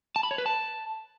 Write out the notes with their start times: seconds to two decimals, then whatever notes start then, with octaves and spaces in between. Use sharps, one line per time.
0.16 A5
0.23 B5
0.31 C#5
0.38 B4
0.46 A5